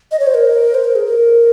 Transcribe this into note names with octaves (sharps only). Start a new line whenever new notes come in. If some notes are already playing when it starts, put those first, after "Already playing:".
D#5
C#5
C5
A#4
C5
A#4
G#4
A#4